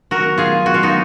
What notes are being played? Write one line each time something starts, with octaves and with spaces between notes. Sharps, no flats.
D#3 F#3 B3 F#4 A#4
F4 G#4
F#4
F4
D#4 F#4